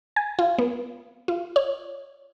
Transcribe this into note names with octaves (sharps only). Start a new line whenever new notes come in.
G#5
F4
B3
F4
C#5